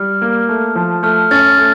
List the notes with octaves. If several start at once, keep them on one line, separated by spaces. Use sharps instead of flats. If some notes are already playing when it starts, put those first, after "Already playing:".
Already playing: G3 F6
A#3
A3
F3
A3 F6
C#4 F6 A6
A3